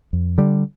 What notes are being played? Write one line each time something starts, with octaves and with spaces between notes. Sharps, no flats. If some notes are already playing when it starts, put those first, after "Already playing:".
F2
D3 G3